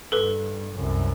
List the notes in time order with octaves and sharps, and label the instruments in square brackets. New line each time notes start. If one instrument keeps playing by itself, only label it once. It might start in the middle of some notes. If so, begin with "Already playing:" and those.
[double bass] G2 [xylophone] A4 B4
[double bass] C2 F#2